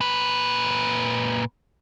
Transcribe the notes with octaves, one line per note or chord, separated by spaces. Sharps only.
A#2 B4